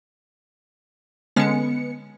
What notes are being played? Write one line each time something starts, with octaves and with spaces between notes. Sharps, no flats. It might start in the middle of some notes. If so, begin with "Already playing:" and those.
D3 G#3 B3 C#4 C#7